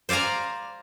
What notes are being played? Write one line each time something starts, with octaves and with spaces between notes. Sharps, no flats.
C5 D5 F5 G#5 A#5